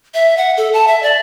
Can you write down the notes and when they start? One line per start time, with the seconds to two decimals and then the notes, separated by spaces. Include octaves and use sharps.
0.14 E5
0.37 F#5
0.57 A4
0.73 A5
0.87 E5
1.03 D5